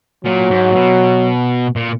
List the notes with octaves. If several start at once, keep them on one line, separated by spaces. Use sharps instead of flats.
A#2 F#3
G#2
A#2
B2
A#2